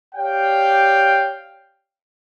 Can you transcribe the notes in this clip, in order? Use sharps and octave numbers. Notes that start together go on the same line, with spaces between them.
G4 C#5 D5 F5 G5